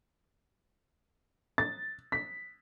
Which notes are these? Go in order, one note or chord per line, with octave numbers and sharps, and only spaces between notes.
A6
B6